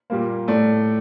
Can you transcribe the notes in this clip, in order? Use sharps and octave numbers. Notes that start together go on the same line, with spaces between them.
A#2 G3 A#3
A2 A3 D5